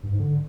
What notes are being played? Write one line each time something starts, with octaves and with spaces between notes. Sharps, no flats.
G2
G#2
D3